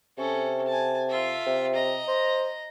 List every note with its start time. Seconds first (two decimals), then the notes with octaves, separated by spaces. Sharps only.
0.18 C3 C#4 A4
0.68 G#5 A5
1.10 F4 E5
1.46 C3
1.75 D#5 A#5
2.07 C5